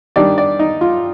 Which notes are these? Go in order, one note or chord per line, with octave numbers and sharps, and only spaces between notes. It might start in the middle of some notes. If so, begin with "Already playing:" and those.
D#3 G3 D4 D5
D5
D#4
F4